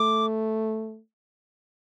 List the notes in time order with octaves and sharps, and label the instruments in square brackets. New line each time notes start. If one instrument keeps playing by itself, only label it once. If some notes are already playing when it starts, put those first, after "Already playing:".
Already playing: [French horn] A3 [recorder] D6